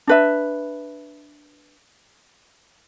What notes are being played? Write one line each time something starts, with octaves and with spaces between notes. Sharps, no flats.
D4 B4 E5